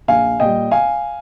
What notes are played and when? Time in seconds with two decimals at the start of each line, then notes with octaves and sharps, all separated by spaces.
0.08 A#1 F5 G#5
0.40 A#2 G3 D#5 G5
0.71 F5 G#5